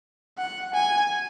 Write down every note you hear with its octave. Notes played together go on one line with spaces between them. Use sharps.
F#5
G#5